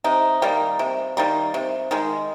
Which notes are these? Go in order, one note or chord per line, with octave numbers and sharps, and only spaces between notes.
C3 D#4
D#3 G3 A#3
C3
D#3 G3 A#3
C3
D#3 G#3